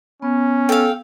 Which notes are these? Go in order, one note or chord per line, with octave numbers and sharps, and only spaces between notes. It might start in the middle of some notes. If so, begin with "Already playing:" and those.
B3 C#4
A4 F5 G5